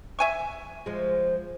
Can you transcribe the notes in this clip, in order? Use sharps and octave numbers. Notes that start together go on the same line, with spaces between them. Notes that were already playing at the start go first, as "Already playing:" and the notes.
E5 G#5 C#6
F3 G#3